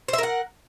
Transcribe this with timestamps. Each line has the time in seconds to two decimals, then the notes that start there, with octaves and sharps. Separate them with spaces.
0.08 C5
0.13 E5
0.18 A#4
0.23 F#5